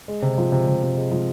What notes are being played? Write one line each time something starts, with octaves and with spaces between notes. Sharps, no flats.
G#3
C3
F3
C3
C3
C3
G#3
F3